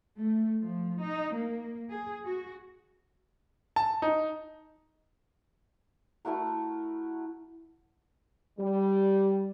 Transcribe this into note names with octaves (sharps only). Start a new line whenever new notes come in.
A3
F3
D#4
A#3
G#4
F#4
A5
D#4
A3 E4 F#4 A#4
G3